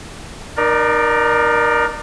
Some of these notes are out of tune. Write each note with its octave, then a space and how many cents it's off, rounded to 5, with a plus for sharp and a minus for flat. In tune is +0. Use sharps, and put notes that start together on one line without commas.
D#4 -35 A#4 +20 D5 +0